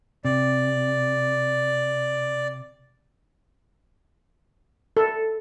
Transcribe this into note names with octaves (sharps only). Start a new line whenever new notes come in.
C3 D5
A4